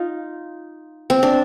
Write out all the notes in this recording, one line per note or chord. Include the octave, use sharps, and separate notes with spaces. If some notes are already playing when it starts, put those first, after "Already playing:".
Already playing: D#4 F4
C4
D4